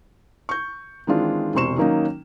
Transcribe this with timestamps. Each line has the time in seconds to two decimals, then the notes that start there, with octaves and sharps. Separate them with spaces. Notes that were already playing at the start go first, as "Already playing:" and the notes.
0.49 C#6 G6
1.07 D#3 E3 G#3 C4 D4 F4
1.55 E1 C3 C5 C6 C#6 E7
1.78 D#3 F#3 A#3 C#4 D#4